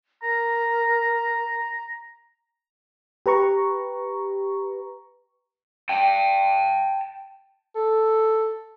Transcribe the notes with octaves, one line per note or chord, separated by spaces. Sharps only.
A#4 A#5
G4 B4 A#5 C#6
G5 A5
A4